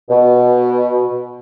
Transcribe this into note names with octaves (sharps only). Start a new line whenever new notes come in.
B2